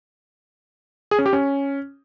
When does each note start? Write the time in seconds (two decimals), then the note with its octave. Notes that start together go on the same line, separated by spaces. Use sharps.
1.11 G#4
1.19 C#4
1.26 G4
1.33 C#4